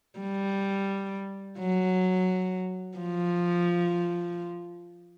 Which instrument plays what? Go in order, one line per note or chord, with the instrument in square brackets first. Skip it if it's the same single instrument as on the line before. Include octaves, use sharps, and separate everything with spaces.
[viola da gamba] G3
F#3
F3